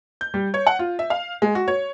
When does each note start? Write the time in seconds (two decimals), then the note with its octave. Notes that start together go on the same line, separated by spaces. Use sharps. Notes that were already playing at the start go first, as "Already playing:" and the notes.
0.21 G6
0.34 G3
0.54 C#5
0.67 F#5
0.79 F4
0.99 E5
1.10 F5
1.42 G#3
1.55 F#4
1.68 C#5